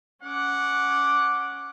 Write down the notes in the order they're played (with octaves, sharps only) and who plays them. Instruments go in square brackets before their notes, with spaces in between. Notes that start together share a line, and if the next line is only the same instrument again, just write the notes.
[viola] C#4 D6 [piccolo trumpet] F#5